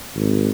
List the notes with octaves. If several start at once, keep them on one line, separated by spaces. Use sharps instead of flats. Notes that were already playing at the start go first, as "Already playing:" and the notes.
G#1